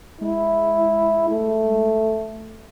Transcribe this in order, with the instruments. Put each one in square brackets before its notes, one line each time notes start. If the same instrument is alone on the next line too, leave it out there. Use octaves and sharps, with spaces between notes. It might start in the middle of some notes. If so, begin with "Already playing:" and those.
[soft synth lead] G#3 [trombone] E4
[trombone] A3